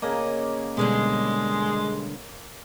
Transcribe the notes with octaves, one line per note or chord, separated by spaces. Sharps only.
C#3 A#3 D#5
B2 D3 G3 G#3